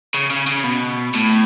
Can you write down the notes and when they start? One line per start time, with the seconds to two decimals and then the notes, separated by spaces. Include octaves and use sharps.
0.14 C#3
0.30 C#3
0.47 C#3
0.64 B2
1.14 A2